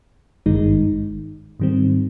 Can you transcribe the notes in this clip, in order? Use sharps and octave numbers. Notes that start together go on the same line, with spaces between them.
G#1 G2 D#3 G#3 D#4
G#2 D#3 G3 C4